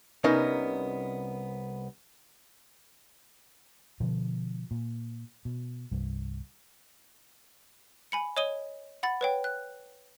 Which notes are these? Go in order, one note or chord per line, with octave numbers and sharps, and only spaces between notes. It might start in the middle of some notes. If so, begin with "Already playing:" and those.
C2 B3 C#4 D#4 A#4
B2 D3 F3
A#2
B2
C2 G2
G#5 B5 C#7
C#5 D#5 D#6 D#7 G7
F#5 B5 A6
B4 C#5 G5
F#6